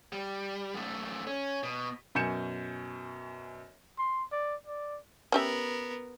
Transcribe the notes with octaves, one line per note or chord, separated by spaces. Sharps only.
G3
F#2 A3
C#4
B2
F#2 B2 G#5 G6 C#7 E7
C6
D5
D5
B3 C#4 G4 A#4 E5